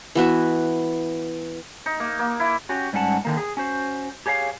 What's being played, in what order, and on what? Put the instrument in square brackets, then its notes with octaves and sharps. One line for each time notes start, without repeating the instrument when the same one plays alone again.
[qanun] E3 B3 F#4 E5
[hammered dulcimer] D#4
A#3
A#3
E4
[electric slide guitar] C#4 F#4 G4
G#2 G3 C#4 F#5 A5
D3 D#3 A#3
G#4
C#4 F#4 C5
G4 G#4 C#5 E5 F5